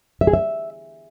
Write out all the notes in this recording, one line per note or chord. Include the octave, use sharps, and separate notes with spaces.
E5
G#4
E5